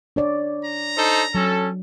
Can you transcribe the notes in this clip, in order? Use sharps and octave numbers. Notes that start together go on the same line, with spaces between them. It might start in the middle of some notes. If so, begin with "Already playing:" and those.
D4 C#5 D5
A#5
D#4 A4 C5
F#3 C#4 A4